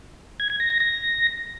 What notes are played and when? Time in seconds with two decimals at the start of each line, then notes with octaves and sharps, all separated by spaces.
0.40 G#6
0.50 G#6
0.60 A#6
0.70 A#6
0.80 A#6